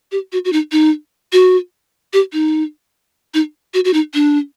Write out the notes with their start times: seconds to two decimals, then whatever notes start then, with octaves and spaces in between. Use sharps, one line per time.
0.12 G4
0.33 F#4
0.45 F#4
0.53 D#4
0.72 D#4
1.33 F#4
2.13 G4
2.33 D#4
3.34 D#4
3.74 F#4
3.85 F#4
3.94 D#4
4.14 D4